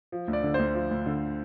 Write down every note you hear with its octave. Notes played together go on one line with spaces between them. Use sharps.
F3
D2
D5
D3
D2 C5
F3
D2
D3